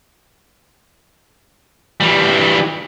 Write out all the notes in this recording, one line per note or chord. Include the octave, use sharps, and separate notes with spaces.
E3 G3